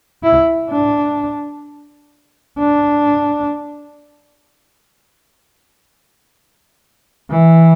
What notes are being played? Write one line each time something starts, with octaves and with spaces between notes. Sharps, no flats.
E4
D4
D4
E3